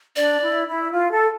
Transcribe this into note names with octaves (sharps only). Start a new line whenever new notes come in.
D4 D5
E4
E4
F4
A4